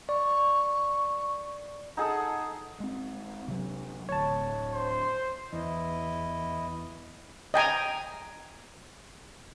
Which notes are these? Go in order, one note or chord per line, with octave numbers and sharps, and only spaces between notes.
D5 C#6
D#4 G#4 A4 F#5
G#3 C4
C3 F#3
D1 D2 C#5 A5
C5
E2 E4 D#5
D#5 G5 G#5 A#5